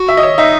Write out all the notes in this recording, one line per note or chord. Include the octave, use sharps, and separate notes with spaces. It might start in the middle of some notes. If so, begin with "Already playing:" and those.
Already playing: F#4
E5
D#5
C#5
D#4 E5